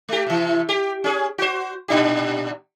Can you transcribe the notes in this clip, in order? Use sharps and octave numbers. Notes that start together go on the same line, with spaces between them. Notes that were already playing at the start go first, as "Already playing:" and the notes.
A3 G4
C3 E3
G4
C#4 G#4
F#4 C5
A#2 D4 G4